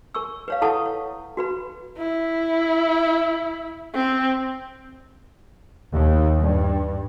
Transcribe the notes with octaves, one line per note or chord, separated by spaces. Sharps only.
A#4 C#6 E6
B4 C#5 F5
E4 A4 F#5 A5 C#6 D#6
C#5
F#4 B4 B5
E4
C4
D#2
G2